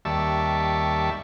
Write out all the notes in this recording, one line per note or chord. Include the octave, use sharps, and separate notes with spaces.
D#2 G3 E5 A5 C#6